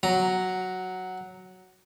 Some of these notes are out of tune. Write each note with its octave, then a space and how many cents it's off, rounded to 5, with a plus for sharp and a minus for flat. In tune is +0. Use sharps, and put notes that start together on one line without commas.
F#3 +0 A#5 +0